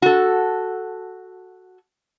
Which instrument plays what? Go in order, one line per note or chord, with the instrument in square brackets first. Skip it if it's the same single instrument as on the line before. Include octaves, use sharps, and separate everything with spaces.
[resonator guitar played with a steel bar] F#4 A4